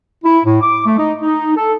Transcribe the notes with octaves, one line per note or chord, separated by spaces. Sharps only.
E4
A2
D6
A3
D#4
D#4
A4